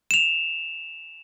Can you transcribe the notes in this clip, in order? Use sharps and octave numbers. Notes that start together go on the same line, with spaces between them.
E7 F7